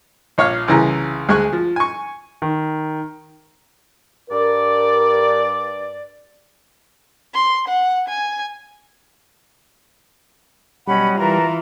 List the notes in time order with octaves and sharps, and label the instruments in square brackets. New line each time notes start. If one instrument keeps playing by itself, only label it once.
[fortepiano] A#1 C#5 F5 F6
C2 C#3 E3 G#4 A#5
D2 G#3 G#4 G#5 C#6 F#6
F3
G#5 C#6
[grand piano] D#3
[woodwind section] G2 D5 [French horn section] A#4
[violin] C6
F#5
G#5
[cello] B2 F#3 [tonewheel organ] G3 [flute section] C#4 D#5 F#5 [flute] B5
[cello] E3 F4 [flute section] A#4 B4 A5 [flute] A#5